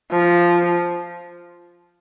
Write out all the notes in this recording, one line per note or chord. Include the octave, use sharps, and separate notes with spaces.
F3